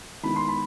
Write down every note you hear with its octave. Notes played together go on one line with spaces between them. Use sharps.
D#3 G#3 B3 E4 B5
C6
B5